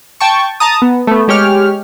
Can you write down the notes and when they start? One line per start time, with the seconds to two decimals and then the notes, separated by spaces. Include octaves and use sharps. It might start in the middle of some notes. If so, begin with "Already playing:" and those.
0.20 G5 A5 C#6
0.60 A5 A#5 D#6
0.82 B3
1.07 A3 B3
1.28 G#3 G4 C#5 F6